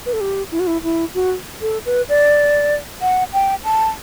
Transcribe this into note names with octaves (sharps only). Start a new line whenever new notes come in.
B4
A4
G4
E4
F#4
E4
E4
F#4
A4
B4
D5
F#5
G5
A5